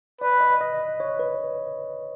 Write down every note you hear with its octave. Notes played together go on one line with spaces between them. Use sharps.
B4 D5
D#5
D#5
C#5
B4